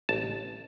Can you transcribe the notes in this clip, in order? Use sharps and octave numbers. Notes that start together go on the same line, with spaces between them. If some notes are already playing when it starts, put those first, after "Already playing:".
A1 A5